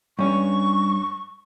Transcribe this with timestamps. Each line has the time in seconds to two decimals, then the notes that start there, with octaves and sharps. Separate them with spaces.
0.19 G2 C#4 C#6